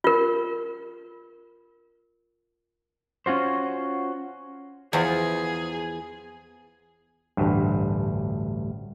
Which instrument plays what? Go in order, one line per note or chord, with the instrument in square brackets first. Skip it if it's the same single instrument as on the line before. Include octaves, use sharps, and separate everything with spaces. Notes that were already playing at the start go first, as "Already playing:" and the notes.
[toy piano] F4 A#4
[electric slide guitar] C#4 F4 F#4 C5
[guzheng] E2 F3 [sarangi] G#4
[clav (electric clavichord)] A1 D2 G2